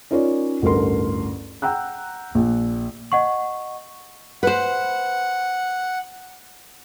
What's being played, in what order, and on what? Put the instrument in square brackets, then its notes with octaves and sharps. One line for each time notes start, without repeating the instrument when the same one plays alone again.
[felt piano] C#4 D#4 F4 A#4 C#5 D5
A1 D2 G2 A4 A#4 C6
F#5 G5 A#5 E6 F#6
A#1
[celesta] D#5 F#5 C#6
[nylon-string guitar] B4 C5 [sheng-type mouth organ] F#5